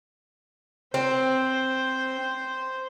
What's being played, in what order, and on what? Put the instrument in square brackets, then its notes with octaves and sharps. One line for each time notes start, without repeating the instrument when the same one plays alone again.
[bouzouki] C4 [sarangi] C5